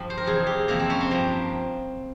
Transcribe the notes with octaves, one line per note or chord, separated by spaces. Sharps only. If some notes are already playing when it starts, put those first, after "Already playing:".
Already playing: G2 F3 G4
C5
A#4
F2 C3 E3 G#4
G4
F2 C3 E3 A#3
C4
C#4
C4
G2 F3 A#3